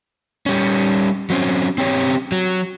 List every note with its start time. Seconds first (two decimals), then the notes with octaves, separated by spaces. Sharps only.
0.46 G3 C#4
1.30 F#3 C4 C#4
1.78 C4 C#4 G4 C#5
2.32 F#3